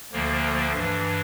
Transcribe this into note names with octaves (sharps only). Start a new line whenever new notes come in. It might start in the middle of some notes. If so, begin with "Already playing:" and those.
D2 D3 F3 A#3
G2 E3 D4